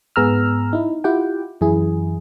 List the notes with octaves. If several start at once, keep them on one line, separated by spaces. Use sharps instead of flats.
G#2 B3 G#4 A#5 E6 F6
D#4 E4
E4 F4 G4 F#5 G5
F#2 E3 E4 G#4